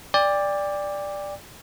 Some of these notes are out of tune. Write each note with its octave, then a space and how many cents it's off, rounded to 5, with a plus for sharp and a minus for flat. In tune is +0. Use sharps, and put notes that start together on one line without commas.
D5 +0 G5 +35